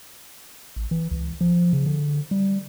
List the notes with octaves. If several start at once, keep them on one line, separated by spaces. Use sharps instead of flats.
A1
E3
C#2
F3
C#3
D3
G3